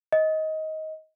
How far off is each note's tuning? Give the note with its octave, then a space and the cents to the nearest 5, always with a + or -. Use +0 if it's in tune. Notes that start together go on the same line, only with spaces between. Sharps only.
D#5 +15